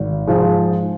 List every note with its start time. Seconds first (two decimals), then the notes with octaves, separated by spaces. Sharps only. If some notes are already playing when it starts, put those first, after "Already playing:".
Already playing: G#1
0.27 G#2 F3 G#3